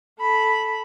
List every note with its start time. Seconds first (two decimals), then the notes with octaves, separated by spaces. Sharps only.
0.20 A4 B5